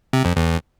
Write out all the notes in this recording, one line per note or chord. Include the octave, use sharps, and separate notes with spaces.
C3
F2
E2